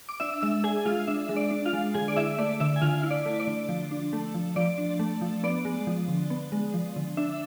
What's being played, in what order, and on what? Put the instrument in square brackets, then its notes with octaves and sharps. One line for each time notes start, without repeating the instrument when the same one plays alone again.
[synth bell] D6
D4 E5 E6
G#3 E5 E6
D4 G#4 G#5
G#3 F4 F5
D4 E5
G#3
D5
D4
F4 F5
G#3
D3 G#4 G#5
D5
E4 E5
A3 D5
D3 E5
G#5
D3 F4 F5
E4
D5
A3
D5
D3
F3
D4
A3
F3
F3 D5
D4
A3
F3
B3 D5
G#3
F3
D3
B3
G#3
F3
D3
D4 E5